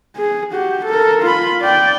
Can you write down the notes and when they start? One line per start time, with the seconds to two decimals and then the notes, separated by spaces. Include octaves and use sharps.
0.16 G#4
0.52 F#4 G4
0.85 A4 A#4
1.22 F4 B5
1.61 D5 G5